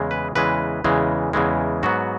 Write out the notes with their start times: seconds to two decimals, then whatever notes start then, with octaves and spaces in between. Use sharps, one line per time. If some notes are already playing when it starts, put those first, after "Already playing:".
Already playing: E2 C#3 E3 G#3
0.11 B4
0.35 E2 C#3 E3 G#3 B4
0.84 E2 C#3 E3 G#3
1.33 E2 C#3 E3 G#3
1.83 G#2 F#3 B3 F#4